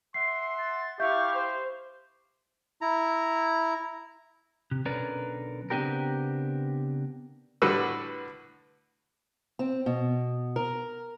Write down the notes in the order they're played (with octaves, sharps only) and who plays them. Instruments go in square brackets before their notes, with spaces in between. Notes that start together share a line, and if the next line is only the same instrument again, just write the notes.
[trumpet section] E5 F#5 C6 [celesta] C7
[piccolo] A6
[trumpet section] E4 G4 [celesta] E5 G6 [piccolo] F5 [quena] C#6
[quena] C5
[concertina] E4 A#5
[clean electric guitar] C3
B1 D3 C#4 A#4 B4 D5
C#3 B3 C4 D4 G4 A#4
[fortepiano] A2 D3 G3 F#4 B4 E6
[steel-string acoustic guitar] C4
B2
A#4